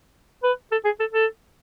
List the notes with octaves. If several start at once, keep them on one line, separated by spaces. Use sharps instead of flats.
B4
A4
G#4
A4
A4